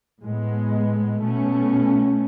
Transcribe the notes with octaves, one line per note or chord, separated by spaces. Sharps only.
A2 G#3 B3
B2 A3 C#4